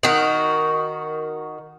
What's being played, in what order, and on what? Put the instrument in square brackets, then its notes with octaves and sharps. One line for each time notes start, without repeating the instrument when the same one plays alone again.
[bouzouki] D#3 F#4